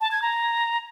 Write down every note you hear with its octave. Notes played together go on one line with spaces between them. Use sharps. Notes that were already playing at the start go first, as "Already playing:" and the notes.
A5
G#6
A#5